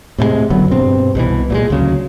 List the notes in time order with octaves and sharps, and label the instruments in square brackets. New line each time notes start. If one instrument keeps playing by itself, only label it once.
[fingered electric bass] A2 C3 E3 G#3
F#1 D3 F#3 B3
G2 B2 C4
C2 B2 E3
A#2 F#3 G#3
D2 C#3 F#3